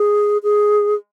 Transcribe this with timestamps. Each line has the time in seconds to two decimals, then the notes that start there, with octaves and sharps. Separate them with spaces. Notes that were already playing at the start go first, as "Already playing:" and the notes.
Already playing: G#4
0.43 G#4